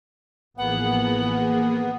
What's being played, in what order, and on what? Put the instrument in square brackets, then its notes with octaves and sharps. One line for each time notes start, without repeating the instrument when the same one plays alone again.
[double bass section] A1 E3 F3 [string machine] A#3 G#4 [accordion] B3 [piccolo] F#5